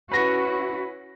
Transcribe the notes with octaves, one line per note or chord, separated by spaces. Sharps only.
C#4 E4 F#4 B4 A#6